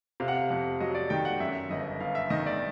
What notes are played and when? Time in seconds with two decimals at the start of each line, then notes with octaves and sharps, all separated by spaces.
0.20 C3 F5
0.28 F#5
0.37 F5
0.50 F2
0.80 F#3 D#5
0.95 D5
1.10 D#3 G5
1.25 F#5
1.40 F#2 E5
1.70 G1 D#5
2.00 G1 F5
2.15 E5
2.30 D#3 D#5
2.46 D5